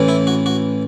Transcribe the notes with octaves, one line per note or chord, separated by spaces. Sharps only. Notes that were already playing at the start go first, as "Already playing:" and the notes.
Already playing: A1 A2 E3
E4
F#4
F#4